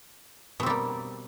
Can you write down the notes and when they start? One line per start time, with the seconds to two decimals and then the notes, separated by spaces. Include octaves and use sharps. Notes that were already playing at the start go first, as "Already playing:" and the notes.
0.60 B2
0.63 C4
0.66 G3
0.70 A#3